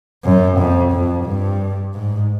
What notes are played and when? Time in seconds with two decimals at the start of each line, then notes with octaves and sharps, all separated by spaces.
0.24 F#2
0.58 F2
0.92 F2
1.25 G2
1.94 G#2